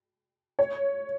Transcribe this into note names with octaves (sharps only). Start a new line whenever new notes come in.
C#5